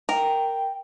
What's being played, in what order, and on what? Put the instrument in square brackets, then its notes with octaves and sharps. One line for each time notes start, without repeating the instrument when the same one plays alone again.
[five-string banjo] A#4 [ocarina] G5